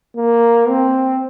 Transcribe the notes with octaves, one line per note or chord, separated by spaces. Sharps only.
A#3
C4